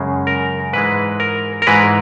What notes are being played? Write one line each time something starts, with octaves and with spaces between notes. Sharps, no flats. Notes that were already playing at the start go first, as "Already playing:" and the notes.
Already playing: F#2 C#3 G#3
A#4
G#2 E3 G#3 B4
A#4
A#4
G#2 E3 G#3 B4